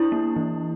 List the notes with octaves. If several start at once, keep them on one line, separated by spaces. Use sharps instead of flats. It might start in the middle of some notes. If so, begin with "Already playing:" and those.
Already playing: D4 E4
A#3
E3